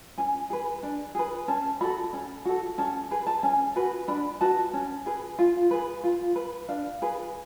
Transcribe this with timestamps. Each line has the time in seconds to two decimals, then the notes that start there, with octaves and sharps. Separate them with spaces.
0.18 C#4 G#5
0.50 G#4 B4
0.83 D4
1.15 G#4 B4
1.48 C#4 A5
1.81 F#4 A4 B5
2.13 C#4
2.45 F#4 A4
2.78 C#4 A5
3.11 G#4 B4
3.27 A5
3.43 C#4 G#5
3.76 F#4 B4
4.08 D4 B5
4.41 F#4 B4 A5
4.73 C#4
5.06 G#4 B4
5.39 F4
5.71 G#4 B4
6.04 F4
6.36 B4
6.69 D4 F5
7.02 G#4 B4